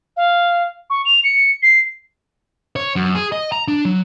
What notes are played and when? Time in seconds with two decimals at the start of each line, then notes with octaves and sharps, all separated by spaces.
0.17 F5
0.90 C#6
1.05 F7
1.24 C#7
1.63 C7
2.76 C#5
2.96 F#2
3.15 G#4
3.32 D#5
3.52 A#5
3.68 D4
3.85 F#3